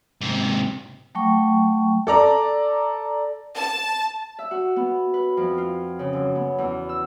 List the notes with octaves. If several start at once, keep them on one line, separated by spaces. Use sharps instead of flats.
G#2 C3
F#3 A3 G5 C#6
A4 D5 A#5
A5
E5
F#4
B3
B4
F2
F4
C#3
F#2
B3
E2
E6